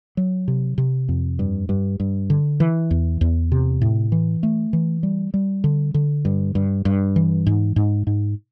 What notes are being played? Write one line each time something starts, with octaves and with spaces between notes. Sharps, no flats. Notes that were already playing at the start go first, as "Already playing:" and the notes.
F#3
C3
C3
F2
G2
G2
G2
D3
E3
E2
E2
C3
A2
E3
A3
E3
G3
G3
D3
D3
G2
G2
G2
E3
G#2
G#2
G#2